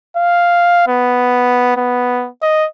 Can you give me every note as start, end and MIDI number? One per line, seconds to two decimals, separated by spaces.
0.17 0.87 77
0.88 1.75 59
1.77 2.28 59
2.42 2.66 75